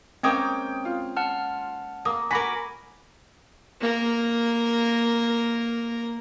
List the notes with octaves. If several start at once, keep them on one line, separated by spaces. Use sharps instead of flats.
G#3 A#3 C4 C#4 G5 D#6 G#6
F4
F#5 A5 F6
A#3 D#6
F#4 A#4 G#5 B5 D6 B6
A#3 A#4